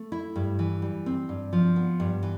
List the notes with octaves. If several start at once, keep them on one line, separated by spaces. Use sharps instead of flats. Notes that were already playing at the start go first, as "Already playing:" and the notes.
Already playing: A3
E4
G2
E3
G3
C4
G2
F3
B3
G2
E3